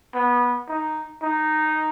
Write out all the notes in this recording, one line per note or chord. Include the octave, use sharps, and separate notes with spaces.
B3
D#4
D#4